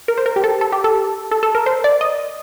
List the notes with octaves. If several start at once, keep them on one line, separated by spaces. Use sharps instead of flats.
A#4
C5
A#4
G4
A4
A4
G4
A4
A4
A4
A#4
C5
D5
D#5